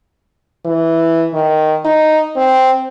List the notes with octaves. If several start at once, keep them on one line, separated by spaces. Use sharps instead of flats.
E3
D#3
D#4
C4